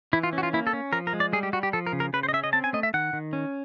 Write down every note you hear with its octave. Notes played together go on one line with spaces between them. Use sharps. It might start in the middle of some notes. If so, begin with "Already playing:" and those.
E3 E4
F4
C#4
F#4
F4
A#3 E4
A4
C#4
F3 A#4
A#4
G#3
D5
G3 G#4
G4
G3 F#4
G4
F3 A4
A#4
C#3
A#4
C#3 B4
C5
D#5
C#4 E5
D#5
C4 A5
G#5
A3 D#5
E5
D#3 F#5
D#3
C#4